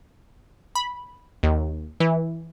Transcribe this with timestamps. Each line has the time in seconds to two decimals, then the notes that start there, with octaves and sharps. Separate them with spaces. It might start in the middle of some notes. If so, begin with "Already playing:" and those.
0.75 B5
1.43 D#2
2.00 E3